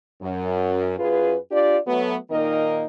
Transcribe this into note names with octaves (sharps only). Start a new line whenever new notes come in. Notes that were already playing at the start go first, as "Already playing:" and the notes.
F#2
F#2 F4 G#4 B4
D4 F4 G4 D5
F#3 A3 B3
A#2 D#3 A#3 D#4 A#4 D#5